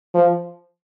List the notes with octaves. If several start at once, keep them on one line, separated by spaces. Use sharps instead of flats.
F3